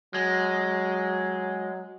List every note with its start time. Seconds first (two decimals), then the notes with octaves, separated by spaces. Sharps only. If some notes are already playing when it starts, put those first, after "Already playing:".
0.14 F#3 G#3